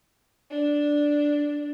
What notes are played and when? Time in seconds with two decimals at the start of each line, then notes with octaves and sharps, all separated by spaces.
0.51 D4